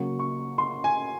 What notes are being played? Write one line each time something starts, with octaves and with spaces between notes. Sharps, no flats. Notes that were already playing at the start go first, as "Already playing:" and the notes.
Already playing: C#3 F#3 A#3 C#6
C#6
C6
G#5